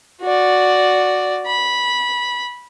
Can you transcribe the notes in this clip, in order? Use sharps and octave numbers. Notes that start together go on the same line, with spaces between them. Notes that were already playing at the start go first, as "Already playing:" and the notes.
F#4 D5
B5